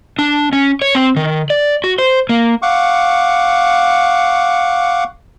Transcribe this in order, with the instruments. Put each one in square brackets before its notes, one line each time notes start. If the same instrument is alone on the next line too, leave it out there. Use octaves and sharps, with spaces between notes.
[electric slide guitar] D4
C#4
C#5
C4
D#3
D5
F#4
C5
A#3
[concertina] F5 F#5 C#6 D6